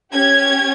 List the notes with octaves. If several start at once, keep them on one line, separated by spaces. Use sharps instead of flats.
C#4 G4 G#6